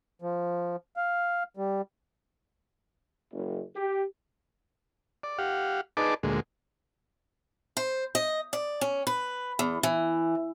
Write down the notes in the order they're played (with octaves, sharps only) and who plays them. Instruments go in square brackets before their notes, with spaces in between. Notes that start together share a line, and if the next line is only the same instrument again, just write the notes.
[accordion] F3
F5
G3
[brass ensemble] F#1
G4
[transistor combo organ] D5
G4 F5 F#5
D#4 G#4 B4 D5 A5 D6
D2 A#2 G#3
[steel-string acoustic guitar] C5
D#5
D5
C#4
B4
E2
E3